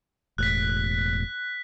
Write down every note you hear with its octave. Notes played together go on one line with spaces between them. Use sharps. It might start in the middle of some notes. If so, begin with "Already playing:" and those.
E1 A2 F#6 B6